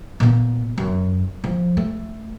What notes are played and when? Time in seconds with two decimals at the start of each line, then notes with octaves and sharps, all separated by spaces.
0.20 A#2 B3
0.78 F#2
1.44 F3
1.77 A3